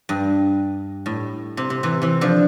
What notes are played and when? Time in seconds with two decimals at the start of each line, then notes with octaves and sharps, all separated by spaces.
0.09 G2
1.06 A2
1.57 C3
1.70 C3
1.83 C3 E3
2.02 C3 E3
2.21 D3 F3